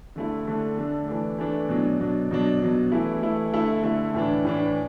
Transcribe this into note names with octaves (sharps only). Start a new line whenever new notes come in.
D3 A3 E4
D3 A3 D4
D3 A3 D4
E3 A3 D4
E3 A3 D4
B2 F#3 D4
B2 F#3 D4
B2 F#3 D4
B2 F#3 D4
E3 A3 E4
E3 A3 E4
D3 A3 E4
D3 A3 E4
A2 E3 D4
A2 E3 D4